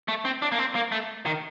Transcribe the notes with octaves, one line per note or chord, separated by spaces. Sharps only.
A3
C4
D4
A#3
C4
A#3
A3
D#3